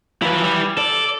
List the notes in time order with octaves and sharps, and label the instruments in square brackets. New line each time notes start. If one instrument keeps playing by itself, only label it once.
[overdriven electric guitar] F3 F#3 [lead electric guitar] E4 B4
[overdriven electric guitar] G3
[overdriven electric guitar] A4 [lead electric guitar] D5